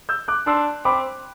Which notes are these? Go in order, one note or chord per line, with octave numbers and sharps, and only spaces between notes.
E6 G6
D6 F#6
D4 C6 E6
C4 B5 D6